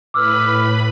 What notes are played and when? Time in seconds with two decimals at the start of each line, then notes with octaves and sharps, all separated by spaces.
0.14 A2 B4 B5 D6 E6 F6